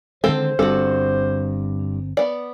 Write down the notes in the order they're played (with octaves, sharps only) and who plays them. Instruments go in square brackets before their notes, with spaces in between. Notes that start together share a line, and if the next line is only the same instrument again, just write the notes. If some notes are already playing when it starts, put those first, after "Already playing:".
[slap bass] D3 D#3 G#3 [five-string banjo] C4 A4 [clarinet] C5
[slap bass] G1 C4 [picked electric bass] G2 [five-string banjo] F#4 A4
[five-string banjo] B3 D5